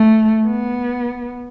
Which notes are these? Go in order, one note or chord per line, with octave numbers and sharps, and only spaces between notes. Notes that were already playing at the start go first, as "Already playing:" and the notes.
Already playing: A3
B3